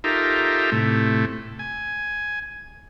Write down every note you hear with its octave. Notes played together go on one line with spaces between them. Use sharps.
D#4 F4 G4 A4 A#4 E5
A2 C3 A3
G#5